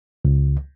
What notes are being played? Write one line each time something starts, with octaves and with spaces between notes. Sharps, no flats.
C#2